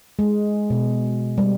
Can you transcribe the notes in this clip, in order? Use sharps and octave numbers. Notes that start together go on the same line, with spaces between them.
G#3
B2
G3